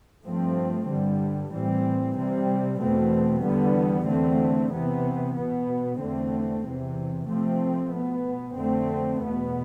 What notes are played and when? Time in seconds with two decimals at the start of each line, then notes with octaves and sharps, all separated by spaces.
0.25 G2 F3 A3 C4
0.89 G2 D3 G3
1.53 A2 E3 G3 C4
2.16 C3 G3 C4
2.81 E2 B2 A3 C4
3.44 E2 D3 G3 B3
4.08 E2 D3 A3 C4
4.72 C3 E3 B3
5.37 B2 B3
6.00 E2 D3 A3 C4
6.64 E2 C3 E3
7.29 C3 F3 A3 C4
7.92 B2 B3
8.56 F2 D3 A3 C4
9.20 E2 B2 B3